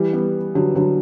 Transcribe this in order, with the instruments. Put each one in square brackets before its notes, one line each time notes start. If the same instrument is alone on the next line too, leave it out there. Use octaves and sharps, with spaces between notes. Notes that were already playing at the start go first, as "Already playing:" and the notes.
Already playing: [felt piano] E3 G3
G3 B3
D3 F#3
D3 F#3